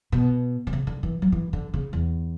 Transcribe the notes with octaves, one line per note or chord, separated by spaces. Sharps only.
B2
D3
C#3
D3
E3
F#3
E3
D3
C#3
E2